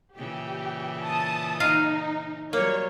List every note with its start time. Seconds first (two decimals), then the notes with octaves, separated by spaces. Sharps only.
0.16 A#2 C#3 E3 G4
1.04 A5 D#6
1.60 D#4 F4 D#5 F5
2.53 F#3 G3 A#3 C#5